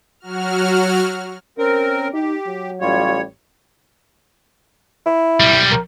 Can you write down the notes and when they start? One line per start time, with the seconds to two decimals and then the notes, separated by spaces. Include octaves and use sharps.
0.20 F#3 F#4 F6
1.58 C4 C#4 A#4
2.13 D#4 G4
2.47 F#3
2.81 A1 G3 F4 C#5
5.06 E4
5.40 B1 G3
5.71 A#4